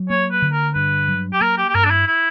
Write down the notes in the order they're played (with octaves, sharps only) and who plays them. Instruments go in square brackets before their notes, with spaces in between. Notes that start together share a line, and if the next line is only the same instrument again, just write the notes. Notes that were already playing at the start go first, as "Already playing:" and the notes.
Already playing: [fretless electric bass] F#3
[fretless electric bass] A#3 [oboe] C#5
[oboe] B4
[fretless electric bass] D3
[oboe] A#4
[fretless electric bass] G2 [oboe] B4
[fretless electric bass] F#3
[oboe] G4
[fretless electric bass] A#3 [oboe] A#4
[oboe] G4
G4
[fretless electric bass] G2 [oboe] A#4
[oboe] D4
E4
E4